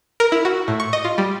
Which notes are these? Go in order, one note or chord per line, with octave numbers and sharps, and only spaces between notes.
A#4
E4
F#4
A2
C#6
D#5
F4
G3